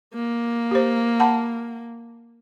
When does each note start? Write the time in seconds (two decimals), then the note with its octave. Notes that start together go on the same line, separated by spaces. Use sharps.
0.14 A#3
0.71 G4 C5
1.20 F#5 A5 B5